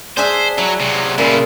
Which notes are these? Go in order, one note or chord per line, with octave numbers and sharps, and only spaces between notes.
D4 G#4 C5 E5
F#3 E4
C3 F#3
A#2 C#3 E4